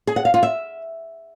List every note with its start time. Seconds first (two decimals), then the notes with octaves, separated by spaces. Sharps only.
0.07 G#4
0.16 F#5
0.25 F5
0.34 F4
0.43 E5